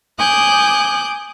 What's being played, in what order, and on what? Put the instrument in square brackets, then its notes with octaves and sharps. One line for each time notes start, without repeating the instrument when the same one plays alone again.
[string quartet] G#5 D6 D#6 F#6 G6